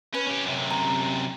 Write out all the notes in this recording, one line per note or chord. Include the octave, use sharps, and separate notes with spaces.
C#4 B4
C#4 G4
F#2 C3
A#5